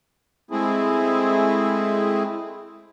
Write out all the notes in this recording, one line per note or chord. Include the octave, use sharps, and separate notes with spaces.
G#3 A3 C4 E4 G#4